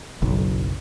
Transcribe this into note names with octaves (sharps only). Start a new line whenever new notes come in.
F#1 B1